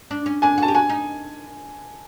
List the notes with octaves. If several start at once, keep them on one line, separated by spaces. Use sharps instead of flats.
D4
C#4
D4 G#5
F#4 A5
G4
F#4 G#5
D#4